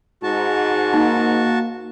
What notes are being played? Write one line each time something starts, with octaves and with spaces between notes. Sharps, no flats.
G#2 F#4 A5
A#3 D#4